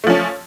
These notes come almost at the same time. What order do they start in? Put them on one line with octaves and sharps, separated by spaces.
A3 F3 C#4